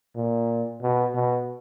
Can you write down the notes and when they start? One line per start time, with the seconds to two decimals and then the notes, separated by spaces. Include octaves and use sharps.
0.16 A#2
0.82 B2
1.15 B2